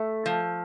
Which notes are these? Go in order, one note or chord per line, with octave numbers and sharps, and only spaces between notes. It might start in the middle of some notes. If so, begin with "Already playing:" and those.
Already playing: A3
F3